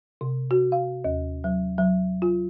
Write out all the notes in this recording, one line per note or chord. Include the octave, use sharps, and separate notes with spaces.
C3
F#4
F5
D#2
F#3
F#3
F4